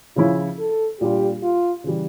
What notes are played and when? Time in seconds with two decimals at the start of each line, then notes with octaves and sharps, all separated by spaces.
0.16 C#3 F3 C#4 E4 F4
0.59 A4
1.00 A#2 G3 D4 F4 G4
1.43 F4
1.84 C#3 E3 G3